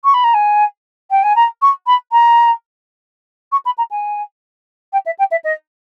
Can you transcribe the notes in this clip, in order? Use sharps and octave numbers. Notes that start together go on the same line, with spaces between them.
C#6
B5
A#5
G#5
G5
G#5
A#5
C#6
B5
A#5
C#6
B5
A#5
G#5
G5
E5
G5
E5
D#5